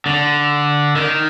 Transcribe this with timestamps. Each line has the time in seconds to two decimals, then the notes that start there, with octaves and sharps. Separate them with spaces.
0.06 D3
0.96 D#3